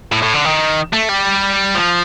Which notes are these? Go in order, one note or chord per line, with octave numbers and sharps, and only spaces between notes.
A2
A2
D3
D#3
A3
G3
F3